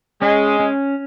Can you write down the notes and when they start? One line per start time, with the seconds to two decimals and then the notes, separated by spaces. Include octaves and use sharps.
0.21 G#3 C#4
0.60 C#4